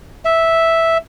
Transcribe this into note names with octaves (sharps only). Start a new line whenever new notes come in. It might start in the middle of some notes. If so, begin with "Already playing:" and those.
E5